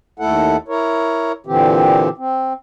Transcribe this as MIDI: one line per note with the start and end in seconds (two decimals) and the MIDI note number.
0.19 0.57 39
0.19 0.57 57
0.19 0.57 64
0.19 0.57 69
0.19 0.57 78
0.68 1.32 64
0.68 1.32 70
0.68 1.32 73
1.46 2.09 46
1.46 2.09 50
1.46 2.09 52
1.46 2.09 60
1.46 2.09 67
2.18 2.53 60